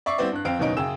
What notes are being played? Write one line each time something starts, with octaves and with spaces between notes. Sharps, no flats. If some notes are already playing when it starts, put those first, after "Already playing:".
D5 E5 C#6 D6 C7
G3 B3 C4 E4 C5 D5
G2 F#6
F2 C4 F5 G5 D7
F#1 D#2 B2 C#4 D#4 D7
F#2 C#3 G#4 G5 E6 E7